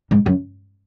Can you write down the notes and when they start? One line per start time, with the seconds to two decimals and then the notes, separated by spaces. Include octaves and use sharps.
0.11 G#2
0.26 F#2